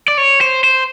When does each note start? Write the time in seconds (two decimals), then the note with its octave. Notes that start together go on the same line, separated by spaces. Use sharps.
0.08 D5
0.18 C#5
0.41 C5
0.64 C5